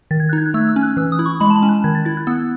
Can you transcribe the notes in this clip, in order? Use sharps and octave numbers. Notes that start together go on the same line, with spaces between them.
D#3 A6
G#6
D#4 F#6
G#6
F#6
A3 E6
E6
C#4
F#6
E3 E6
D#6
E4
C#6
G#3 B5
A5
B5
C#4
F#6
D#3 G#6
A6
E4 A6
F#6
B3 E6